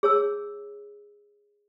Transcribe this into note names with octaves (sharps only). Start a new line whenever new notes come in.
G#4 C#5 A5 E6